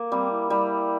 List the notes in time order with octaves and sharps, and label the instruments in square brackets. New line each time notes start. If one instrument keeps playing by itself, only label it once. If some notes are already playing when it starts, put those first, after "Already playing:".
Already playing: [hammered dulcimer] A#3
[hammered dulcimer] G3 [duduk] C4
[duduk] E4
[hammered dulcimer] G3 [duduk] E4